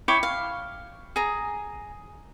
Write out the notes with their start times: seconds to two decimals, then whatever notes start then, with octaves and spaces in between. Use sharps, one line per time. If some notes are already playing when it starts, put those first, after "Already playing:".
0.08 E4 C#5 G5 D6
0.23 F5
1.16 G#4 A#5